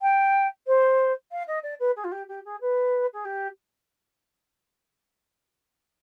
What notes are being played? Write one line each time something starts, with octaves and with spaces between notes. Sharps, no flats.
G5
C5
F5
D#5
D5
B4
G#4
F4
G4
G4
G#4
B4
G#4
G4